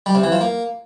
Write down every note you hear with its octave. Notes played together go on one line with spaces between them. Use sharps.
G3
C3
E3
F3
A#3